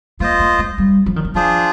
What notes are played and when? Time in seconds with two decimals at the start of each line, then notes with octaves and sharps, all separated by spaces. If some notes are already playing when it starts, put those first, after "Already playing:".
0.20 A#3 F4 C5 D#5
0.40 A#3
0.59 G#3
0.78 G3
1.06 F3
1.16 D#3
1.25 F3
1.35 F3 D4 F4 G#4 C5